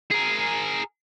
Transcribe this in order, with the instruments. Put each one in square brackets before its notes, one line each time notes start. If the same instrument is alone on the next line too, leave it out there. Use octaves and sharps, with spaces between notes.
[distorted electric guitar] G#4 A#4